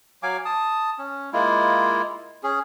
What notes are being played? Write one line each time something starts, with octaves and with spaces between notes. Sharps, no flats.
F#3 F5 G#5 D6
A5 D#6
C#4
G#3 A#3 E4 F4
C#4 G#4